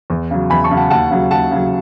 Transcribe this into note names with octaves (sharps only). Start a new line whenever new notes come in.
E2
C#3 F#3
E2 G#5 B5
A5 C#6
C#3 F#3
F#5 A5
D#2 F#5 A5
C#3 F#3
D#2 F#5 A5
C#3 F#3